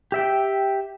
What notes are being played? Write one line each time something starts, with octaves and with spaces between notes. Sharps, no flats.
G4 E5 G5